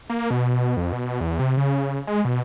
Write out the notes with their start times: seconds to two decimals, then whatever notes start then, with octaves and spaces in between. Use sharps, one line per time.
0.10 A#3
0.31 B2
0.77 F2
0.93 B2
1.21 E2
1.39 C3
1.57 C#3
2.07 G#3
2.25 B2